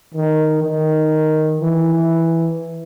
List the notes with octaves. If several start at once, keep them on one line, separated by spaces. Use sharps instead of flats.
D#3
D#3
E3